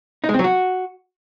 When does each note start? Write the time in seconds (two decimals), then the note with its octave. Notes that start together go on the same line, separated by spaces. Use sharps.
0.24 D#4
0.29 G#3
0.34 C4
0.39 F#3
0.44 F#4